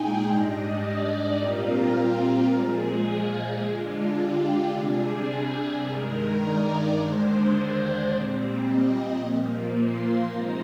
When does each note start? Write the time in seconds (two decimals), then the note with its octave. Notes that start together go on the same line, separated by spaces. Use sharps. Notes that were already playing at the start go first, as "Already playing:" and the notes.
Already playing: A#2 G#3 D#4 G#4 G5
0.24 G#2 G3 D4 D#5
0.80 D5
1.35 A#2 G3 C4 F4 A#4
2.47 A#2 F3 G#3 G#4
3.59 D3 G#3 D4 F4
4.15 G4
4.70 C3 G3 D4 G#4
5.27 G#4
5.82 G2 D#3 G#3 D#4 A#4
6.37 D5
6.93 D#2 D3 G#3 D4 C5
8.05 A#2 G3 C4
8.60 D#5
9.16 A#2 F3 A#3
9.72 C6
10.28 C3 F3 G#3 D#4 A#5